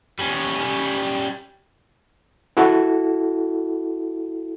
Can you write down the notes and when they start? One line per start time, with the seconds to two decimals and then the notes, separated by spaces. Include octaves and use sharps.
0.19 G3 C#4
2.57 E4 F#4 A4